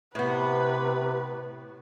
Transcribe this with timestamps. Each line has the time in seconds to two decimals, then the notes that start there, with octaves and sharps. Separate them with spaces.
0.15 A2 C3 B3 B4